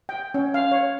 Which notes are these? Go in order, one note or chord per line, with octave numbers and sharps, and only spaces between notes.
G5
C#4
F5
C#5